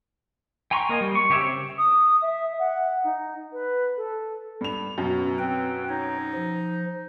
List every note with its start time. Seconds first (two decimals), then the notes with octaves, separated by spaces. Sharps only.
0.71 G5 G#5 A#5 C6 C#6
0.89 A#3 A#4 D#5 G#5
1.01 G3
1.15 C#6
1.30 C#3 G4 C#5 E5
1.42 C4
1.78 D#6
2.22 E5
2.59 F#5
3.04 D#4
3.52 B4
3.97 A4
4.61 G2 F7
4.98 F#2 B2
5.39 C4 B4 G5
5.89 D#4 C#5
6.34 F3